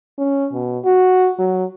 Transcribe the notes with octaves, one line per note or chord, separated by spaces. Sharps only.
C#4
B2
F#4
F#3